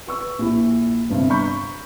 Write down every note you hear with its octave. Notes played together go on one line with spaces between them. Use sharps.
B4 C#6 E6
A#1 E4
G1 G2 C3
A#5 B5 C#6 G6